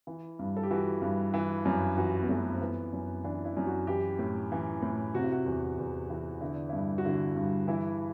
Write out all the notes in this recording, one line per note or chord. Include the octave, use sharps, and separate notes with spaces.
E3
G2
A4
G4
E3 F#4
G2
E3
F#2
E3 F#4
B3
F#2 A3
C4
E3 B3
F#2
E3 D4
E4
F#2
F#4
E3 G4
A2
E3
A2
C3 F#4
E4
F#4
E2
E2
E3
D3 E4
D4
G2 E4
F#4
D3 E4
G2
E3 E4